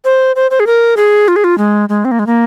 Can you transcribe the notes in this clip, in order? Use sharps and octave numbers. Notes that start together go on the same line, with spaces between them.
C5
C5
C5
G#4
A#4
G#4
F4
G#4
F4
G#3
G#3
C4
A#3
G#3
A#3